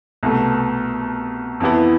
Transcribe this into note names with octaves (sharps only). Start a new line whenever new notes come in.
C2 B2 A3
F2 E3 B3 E4